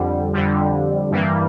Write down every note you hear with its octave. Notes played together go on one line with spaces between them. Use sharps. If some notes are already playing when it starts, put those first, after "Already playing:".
Already playing: F2 D3 G3
F2 D3 G3
G2 E3 G3 A#3